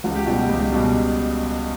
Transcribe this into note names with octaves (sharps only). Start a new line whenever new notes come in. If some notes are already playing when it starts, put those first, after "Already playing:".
C#2 F#4
G4
B2 G3 F#4
G4
C#2
B2 G3